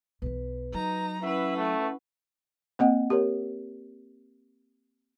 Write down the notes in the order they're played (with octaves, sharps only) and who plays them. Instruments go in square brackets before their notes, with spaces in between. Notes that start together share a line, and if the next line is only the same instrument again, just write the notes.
[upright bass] B1 E3 [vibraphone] B4
[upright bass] F#3 [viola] D#4 A#5
[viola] E3 B4 [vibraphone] C#4 F#5 C#6 [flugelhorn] E5
[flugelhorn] A3
[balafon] A#3 C4 D#5 F#5
G4 A#4 C#5